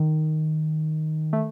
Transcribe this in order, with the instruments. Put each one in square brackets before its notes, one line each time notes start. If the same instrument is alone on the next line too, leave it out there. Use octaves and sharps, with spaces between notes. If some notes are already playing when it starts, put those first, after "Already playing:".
Already playing: [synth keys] D#3
A3